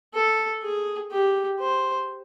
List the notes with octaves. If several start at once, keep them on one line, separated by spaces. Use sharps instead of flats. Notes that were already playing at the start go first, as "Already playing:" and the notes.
A4
G#4
G4
C5